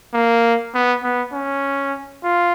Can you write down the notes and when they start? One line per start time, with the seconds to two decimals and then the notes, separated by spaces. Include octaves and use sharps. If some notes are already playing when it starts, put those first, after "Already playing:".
0.14 A#3
0.75 B3
1.04 B3
1.33 C#4
2.24 F4